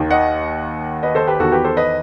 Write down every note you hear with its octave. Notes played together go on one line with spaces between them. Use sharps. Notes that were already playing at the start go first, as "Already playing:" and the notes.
Already playing: D#2 D#3
D#5 F#5
B4 D#5
A4 C5
G4 B4
E2 D#3 F#4 A4
G4 B4
A4 C5
B4 D#5